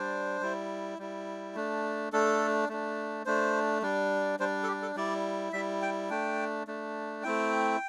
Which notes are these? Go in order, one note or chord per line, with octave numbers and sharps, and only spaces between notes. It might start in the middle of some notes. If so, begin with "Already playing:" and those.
Already playing: G3 D4 C5
G3 E4
G3 E4
A3 D4
A3 D4 A4
A3 D4
A3 D4 C5
G3 D4
G3 D4 C5
A4
G4
A4
G3 E4 D5
G3 E4 E5
G5
A3 D4 G5
A3 D4
A3 C4 E4 G5